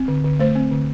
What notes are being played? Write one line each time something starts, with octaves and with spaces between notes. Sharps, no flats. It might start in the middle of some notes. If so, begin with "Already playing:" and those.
Already playing: C4
D3
D3
A3 C5
C4
D3